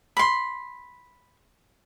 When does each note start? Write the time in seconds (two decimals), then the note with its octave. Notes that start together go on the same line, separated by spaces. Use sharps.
0.17 B5 C6